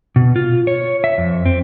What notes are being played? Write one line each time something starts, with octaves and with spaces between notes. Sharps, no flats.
B2
F4
C#5
E5
F2
C4